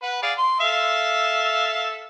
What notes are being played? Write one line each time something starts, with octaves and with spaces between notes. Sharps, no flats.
B4 F#5
G#4 D5 F5
C6
A4 E5 F5